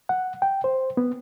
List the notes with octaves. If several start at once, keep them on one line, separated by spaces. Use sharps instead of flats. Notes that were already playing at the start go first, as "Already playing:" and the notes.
F#5
G5
C5
B3